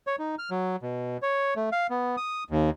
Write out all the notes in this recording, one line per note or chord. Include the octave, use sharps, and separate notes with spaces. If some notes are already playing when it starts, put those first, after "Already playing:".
C#5
D#4
F6
F#3
B2
C#5
A3
F5
B3
D#6
D#2